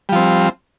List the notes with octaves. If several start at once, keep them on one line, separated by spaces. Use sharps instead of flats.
F3 G3 C4